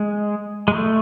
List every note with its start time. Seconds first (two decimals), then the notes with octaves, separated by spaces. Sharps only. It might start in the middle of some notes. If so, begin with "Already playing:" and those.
Already playing: G#3
0.68 G#3
0.74 A3